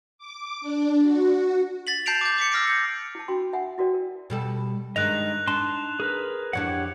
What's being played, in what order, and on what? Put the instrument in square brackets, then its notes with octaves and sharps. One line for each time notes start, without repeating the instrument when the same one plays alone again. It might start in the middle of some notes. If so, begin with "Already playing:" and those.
[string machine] D6
D4
F#4
[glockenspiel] A6 B6 F#7
A5 G6 C7 D7 F7
D6 G6
D6 B6 C#7
D6 E6 F6 A#6 C7 D7
G6 C#7
[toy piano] E4 A5
D4 F#4 G5 B5 C6
E5 F#5 G#5 B5
E4 F#4 A#4 D5 G5
A#4
[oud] B2 G3 A4
[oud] G2 D#3 G#3 [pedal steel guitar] D#5 [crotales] F#6 F7
[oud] D4 D#4 [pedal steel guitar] A5 C6
[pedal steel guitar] G#4 A#4 B4
[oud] F2 E3 D4 [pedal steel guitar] G4 C#5 F#5